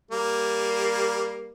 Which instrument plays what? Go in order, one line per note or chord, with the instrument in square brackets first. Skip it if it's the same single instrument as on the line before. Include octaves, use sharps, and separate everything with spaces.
[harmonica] G3 A#3